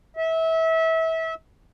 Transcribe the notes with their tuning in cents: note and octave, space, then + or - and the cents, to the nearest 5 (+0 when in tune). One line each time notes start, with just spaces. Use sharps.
E5 -25